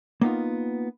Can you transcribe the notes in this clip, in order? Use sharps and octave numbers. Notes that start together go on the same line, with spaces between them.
A#3 B3 D#4 F4